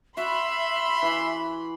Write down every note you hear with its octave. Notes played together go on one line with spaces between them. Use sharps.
F#4 E5 B5 C6
E3